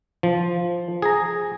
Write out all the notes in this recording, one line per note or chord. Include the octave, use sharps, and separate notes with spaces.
F3
G#4 A#5